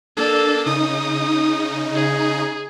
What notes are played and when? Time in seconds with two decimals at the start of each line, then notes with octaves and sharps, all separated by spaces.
0.17 A#3 D4 A4
0.66 C#3 D#4 D#6
1.95 G#4